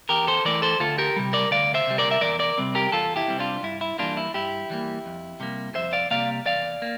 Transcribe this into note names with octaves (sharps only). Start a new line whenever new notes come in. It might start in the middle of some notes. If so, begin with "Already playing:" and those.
E2 G4 A#4
A4 C5
E3 A3 A#4 D5
A4 C5
D2 F4 A4
G4 A#4
C3 G3
A#4 D5
D2 D5 F5
C5 E5
C3 G3
A#4 D5
E5
E2 A#4 D5
A#4 D5
C3 G3 C4
G4 A#4
E2 F4 A4
E4 G4
C3 G3 C4
D4 F4
G2 E4
E4
E3 G3 A#3 D4 F4
E4
G2 E4 G4
E3 G3 A#3
F2
C3 G3 A#3
F2 C5 E5
D5 F5
C3 G3 A#3 D5 F5
E2 D5 F5
A#3